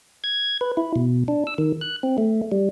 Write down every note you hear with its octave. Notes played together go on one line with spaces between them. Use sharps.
G#6
B4
E4
B2
D4
E6
D#3
F#6
C4
A3
G3